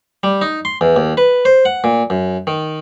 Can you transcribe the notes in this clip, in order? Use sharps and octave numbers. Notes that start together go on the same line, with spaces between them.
G3
D#4
C6
E2
D#2
B4
C5
F#5
A#2
F#2
D#3